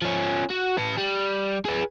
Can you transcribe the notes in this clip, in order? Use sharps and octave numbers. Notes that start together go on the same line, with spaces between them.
F3 C#4
F#4
B4 A5
G3
G#4 B4